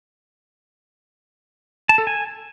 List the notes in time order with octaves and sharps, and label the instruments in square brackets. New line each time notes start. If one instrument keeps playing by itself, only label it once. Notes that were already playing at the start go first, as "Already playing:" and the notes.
[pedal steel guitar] A5
A4
G#5